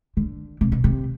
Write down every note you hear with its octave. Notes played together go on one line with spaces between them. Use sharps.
D3
C3
B2
C3